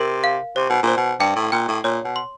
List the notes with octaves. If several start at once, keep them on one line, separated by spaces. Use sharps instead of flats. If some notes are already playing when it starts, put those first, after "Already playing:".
Already playing: C3 A#4
F5
C3 C5
B2
A#2 C5
B2
G2 G5
A2
A#2 G5
A2
A#2 C#5
B2
C6